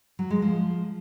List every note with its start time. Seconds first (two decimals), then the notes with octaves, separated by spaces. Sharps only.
0.19 F#3
0.30 G#3
0.42 F3